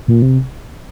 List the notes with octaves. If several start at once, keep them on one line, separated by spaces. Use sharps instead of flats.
A#2
C3